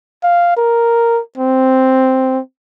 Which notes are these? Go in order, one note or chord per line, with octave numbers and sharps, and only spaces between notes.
F5
A#4
C4